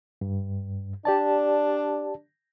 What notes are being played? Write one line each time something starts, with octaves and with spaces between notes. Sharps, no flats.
G2
D4 G4 D5 A5